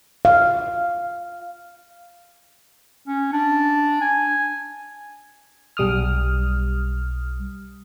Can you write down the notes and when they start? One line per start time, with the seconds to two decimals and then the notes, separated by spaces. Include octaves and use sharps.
0.25 F5
3.07 C#4
3.33 D4
4.01 G#5
5.77 B1 G3 D#6 F6